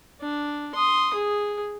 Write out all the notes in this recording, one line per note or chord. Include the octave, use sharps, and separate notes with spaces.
D4
C6 D#6
G#4